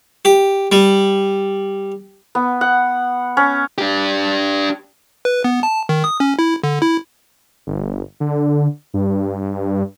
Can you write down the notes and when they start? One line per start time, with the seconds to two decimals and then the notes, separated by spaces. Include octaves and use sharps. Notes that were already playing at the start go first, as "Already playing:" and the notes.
0.25 G4
0.72 G3
2.35 B3
2.61 F#5
3.37 C#4
3.78 D4 G4
5.25 B4
5.44 B3
5.63 A5
5.89 D#3
6.04 D#6
6.20 C#4
6.39 E4
6.63 D3
6.82 E4
7.67 G1
8.20 D3
8.94 G2